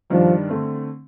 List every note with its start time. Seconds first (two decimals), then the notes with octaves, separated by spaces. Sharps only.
0.11 G2 D#3 F3 G3 D4
0.49 D3 A3 C4